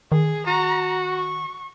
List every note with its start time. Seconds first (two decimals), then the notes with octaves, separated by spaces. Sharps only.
0.12 D#3 G#4
0.47 F#4 A#5
1.12 C#6